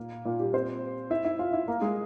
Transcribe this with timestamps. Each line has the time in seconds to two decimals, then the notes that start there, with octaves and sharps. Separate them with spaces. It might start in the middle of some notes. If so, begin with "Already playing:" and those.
Already playing: A#2 A#3
0.25 A#2 A#3
0.40 G3 G4
0.53 C4 C5
1.10 E4 E5
1.25 E4 E5
1.39 F4 F5
1.53 E4 E5
1.68 A#3 A#4
1.82 G#3 G#4